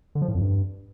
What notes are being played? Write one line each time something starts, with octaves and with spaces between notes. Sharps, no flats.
D3
F3
A2
F2
G2